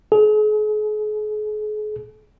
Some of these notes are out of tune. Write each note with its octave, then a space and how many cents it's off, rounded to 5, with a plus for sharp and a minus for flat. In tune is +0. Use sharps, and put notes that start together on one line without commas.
G#4 +40